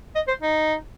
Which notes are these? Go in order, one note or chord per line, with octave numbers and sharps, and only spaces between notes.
D#5
C5
D#4